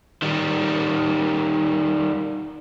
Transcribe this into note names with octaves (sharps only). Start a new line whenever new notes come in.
D#3 G3